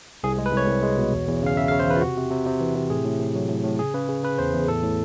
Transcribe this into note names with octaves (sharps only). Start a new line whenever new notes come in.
C2 G#4
G#3
B4
C2 C#5
C2
G#3
B2
E2
E2
C#3 F5
C#3 E5
F5
C#3
C5
E3 B4
F4
C3 F#4
C3
C3
C3
E3
C3
A2 G#4
A2
A2
F#3
A2
A2
C#3 G#4
C#3 B4
C#3
C#3 B4
E2 C5
E2
A2 A4
A2